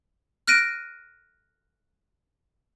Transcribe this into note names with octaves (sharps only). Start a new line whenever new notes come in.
F6 F#6 A#6 D7 D#7